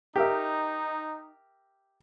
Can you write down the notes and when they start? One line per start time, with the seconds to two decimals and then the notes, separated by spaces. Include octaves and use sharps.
0.16 D#4 G4 A#4 E5